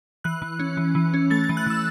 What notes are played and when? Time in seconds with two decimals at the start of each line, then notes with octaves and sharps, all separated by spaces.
0.24 E3 F#6
0.42 E3
0.59 C#4
0.77 E3
0.95 E3
1.14 C#4
1.30 A3 A6
1.44 A6
1.49 E3
1.57 F#6
1.67 E3 E6